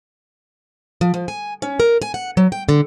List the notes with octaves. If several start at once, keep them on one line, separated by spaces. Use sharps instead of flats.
F3
F3
G#5
C#4
A#4
G#5
F#5
F#3
G5
D3